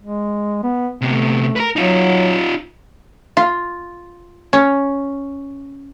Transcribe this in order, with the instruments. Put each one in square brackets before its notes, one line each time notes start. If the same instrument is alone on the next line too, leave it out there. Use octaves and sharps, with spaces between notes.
[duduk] G#3
B3
[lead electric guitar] C3 B3 [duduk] A3
[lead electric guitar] A#4 B4
[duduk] F#3 [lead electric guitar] D#4 F4
[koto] F4
C#4